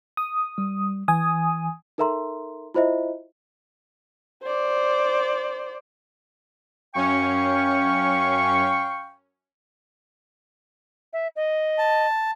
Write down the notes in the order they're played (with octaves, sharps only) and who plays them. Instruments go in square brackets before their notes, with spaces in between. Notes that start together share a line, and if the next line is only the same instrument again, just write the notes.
[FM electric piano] D#6
[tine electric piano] G3
[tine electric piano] E3 [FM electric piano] G#5 D#6
[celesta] D#4 A4 A#4 E5 A#5 C6
E4 F4 C5 D#5 E5
[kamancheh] C5 D5
[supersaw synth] F#2 C#4 [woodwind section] F5 G5 C#6
[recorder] E5
D#5
[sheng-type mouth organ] A5